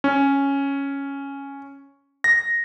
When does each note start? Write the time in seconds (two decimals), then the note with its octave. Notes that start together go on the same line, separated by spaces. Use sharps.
0.04 C#4
2.24 A#6